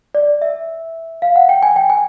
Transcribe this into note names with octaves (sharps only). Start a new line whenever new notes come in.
D5
E5
F5
F#5
G5
G#5
G5
G#5